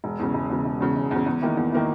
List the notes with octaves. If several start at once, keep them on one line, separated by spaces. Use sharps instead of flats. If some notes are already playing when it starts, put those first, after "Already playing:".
E1
E2 C#3
E1
E2 C#3
E1
E2 C#3
E1
E2 C#3
E2
D#3 A#3 E4
E2
D#3 A#3 E4